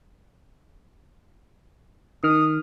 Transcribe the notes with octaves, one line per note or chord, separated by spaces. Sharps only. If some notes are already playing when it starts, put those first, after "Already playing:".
D#3 D#6 F6